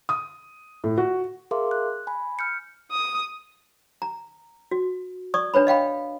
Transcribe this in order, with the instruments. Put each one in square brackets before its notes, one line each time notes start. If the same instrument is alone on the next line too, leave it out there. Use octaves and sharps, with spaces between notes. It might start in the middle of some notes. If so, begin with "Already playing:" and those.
[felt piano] D#6
A2
F#4
[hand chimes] G#4 A#4 E5 F5 C6 D6
F#6
G#5 B5
F6 G6 C#7
[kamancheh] D#6
[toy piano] A#5
F#4
D5 C#6 D#6
D4 B4 C#5 B5
D#5 F5 G5 B5